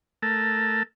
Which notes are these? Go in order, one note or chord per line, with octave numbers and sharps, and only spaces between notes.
A3 A4 A#4